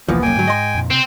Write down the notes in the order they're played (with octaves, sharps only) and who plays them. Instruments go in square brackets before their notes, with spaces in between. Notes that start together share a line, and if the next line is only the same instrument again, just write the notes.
[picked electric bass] E1 C2 A#3 [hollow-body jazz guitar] E3 F3 [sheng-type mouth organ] B3
[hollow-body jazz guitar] F#2 A#2 [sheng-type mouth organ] G5 G#5
[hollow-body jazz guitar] D2 F#3 [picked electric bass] G#2
[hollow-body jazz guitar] D#5 C6
[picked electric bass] F2 A#2
[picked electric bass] C3 [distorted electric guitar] C4